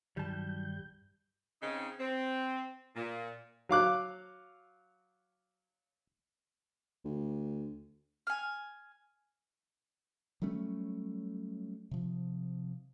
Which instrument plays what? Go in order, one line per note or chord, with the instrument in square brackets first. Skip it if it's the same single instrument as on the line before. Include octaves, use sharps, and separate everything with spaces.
[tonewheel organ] G2 G6 [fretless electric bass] D#3 F#3 [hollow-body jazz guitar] G3 A5
[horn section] C#3 C4 D#4
C4
A#2
[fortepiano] F#3 F5 D6 F#6
[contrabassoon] D2
[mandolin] G#5 F6
[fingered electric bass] F#3 G3 A3 C#4
C3 F3